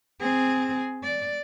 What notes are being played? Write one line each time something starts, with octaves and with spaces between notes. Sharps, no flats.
C4 G#4
D5